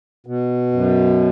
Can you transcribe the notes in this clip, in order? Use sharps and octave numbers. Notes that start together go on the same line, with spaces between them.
B2
F#2